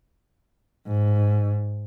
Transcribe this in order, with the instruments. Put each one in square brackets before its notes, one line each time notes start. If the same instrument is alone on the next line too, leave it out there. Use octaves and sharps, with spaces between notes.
[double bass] G#2